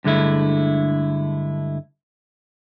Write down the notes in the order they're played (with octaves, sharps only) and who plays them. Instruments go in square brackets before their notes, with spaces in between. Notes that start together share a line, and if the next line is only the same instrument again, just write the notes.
[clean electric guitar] G2 D3 G#3 A3 E4